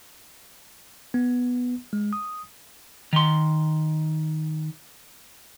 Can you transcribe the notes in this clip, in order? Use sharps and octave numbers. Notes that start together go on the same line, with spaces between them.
B3
G#3
D#6
D#3 C6